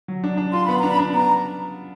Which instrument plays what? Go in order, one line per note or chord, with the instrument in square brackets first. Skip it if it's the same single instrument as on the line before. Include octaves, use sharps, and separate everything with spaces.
[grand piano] F#3
D4
D4
[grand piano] F4 [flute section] C6
[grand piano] B3 [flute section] B5
[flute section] A#5
[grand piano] D4
[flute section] B5
[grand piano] D4
[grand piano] B3 [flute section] A#5